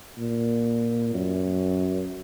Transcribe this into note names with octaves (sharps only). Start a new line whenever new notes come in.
A#2
F#2